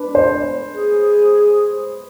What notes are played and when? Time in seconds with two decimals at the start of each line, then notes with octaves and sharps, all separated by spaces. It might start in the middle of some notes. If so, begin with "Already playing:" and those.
Already playing: D4 B4
0.15 C5
0.75 G#4